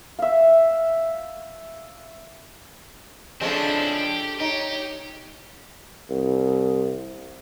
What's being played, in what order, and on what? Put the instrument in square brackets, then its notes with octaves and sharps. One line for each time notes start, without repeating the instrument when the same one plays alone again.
[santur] E5 F5
[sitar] C#3 F3 G#3 [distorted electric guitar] C4 E4 [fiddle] D4 A4
[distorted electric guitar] G4
[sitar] D#4 [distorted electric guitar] G4 [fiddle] C#5
[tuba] C2